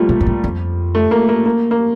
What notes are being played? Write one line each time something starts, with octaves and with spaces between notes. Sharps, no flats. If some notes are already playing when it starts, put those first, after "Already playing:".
Already playing: F3 G3 A3 A#3
A#2
G2
A2
F2
A3
A#3
A#3
A#3
A#3